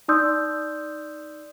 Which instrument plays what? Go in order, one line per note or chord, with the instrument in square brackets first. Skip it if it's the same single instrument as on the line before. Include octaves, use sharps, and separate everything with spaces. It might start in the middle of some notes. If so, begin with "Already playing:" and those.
[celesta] D#4 D5 C6 D#6 E6 G6